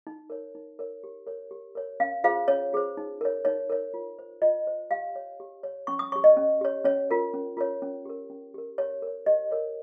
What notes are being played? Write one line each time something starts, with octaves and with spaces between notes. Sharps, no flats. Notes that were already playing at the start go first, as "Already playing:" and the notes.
D#4
A#4 C#5
D#4
A#4 C#5
G4
A#4 C#5
G4
A#4 C#5
C#4 F5
F4 G#4 C5 F5
C#4 C#5
F4 G#4 C5
D#4
A#4 C#5
D#4 C#5
A#4 C#5
F4
C5
F4 D#5
C5
G4 F5
C#5
G4
C#5
C#4 C#6
D#6
G4 C#5 C#6
D#5
C#4
G4 C#5
C#4 C#5
F4 A#4 C#5
C#4
F4 A#4 C#5
C#4
G4 A#4
C#4
G4 A#4
G4 C#5
A#4 C#5
G4 D#5
A#4 C#5